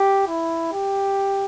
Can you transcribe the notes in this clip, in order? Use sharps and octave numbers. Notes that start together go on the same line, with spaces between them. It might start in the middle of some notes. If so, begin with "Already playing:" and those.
Already playing: G4
E4
G4